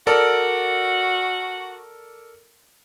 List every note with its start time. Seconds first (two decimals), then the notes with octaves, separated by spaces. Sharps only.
0.07 F#4 A4 A#4 D5